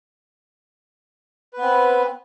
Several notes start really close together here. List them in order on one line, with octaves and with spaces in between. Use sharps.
B4 B3 C4